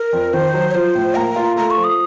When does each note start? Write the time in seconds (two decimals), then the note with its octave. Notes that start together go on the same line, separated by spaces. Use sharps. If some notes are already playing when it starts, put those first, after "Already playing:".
Already playing: A#4
0.13 F2
0.33 D#3 C5
0.54 F#3
0.71 C#5
0.74 F3 C5
0.95 A2
1.15 A#3 A#5
1.36 F4
1.56 A3 A#5
1.70 C#6
1.77 F3
1.84 D#6